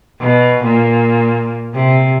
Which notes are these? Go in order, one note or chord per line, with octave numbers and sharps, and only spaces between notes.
B2
A#2
C3